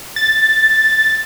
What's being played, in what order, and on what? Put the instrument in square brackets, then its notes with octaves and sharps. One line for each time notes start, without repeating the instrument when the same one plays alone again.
[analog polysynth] A6